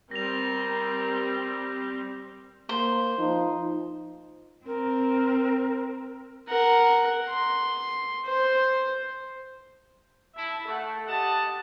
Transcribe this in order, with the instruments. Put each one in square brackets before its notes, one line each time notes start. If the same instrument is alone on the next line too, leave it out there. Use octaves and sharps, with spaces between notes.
[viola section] G3 C4 [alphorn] A#4 [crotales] A#6 F7
[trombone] A#3 [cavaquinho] C5
[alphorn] F3 [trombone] D#4
[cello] C4 [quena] A#4
[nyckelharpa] A#4 F#5
C6
C5
[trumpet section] E4 [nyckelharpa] E5 A5
[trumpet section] A3 [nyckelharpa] A4 F#5
[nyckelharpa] G4 D#5 [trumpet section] F#5 A5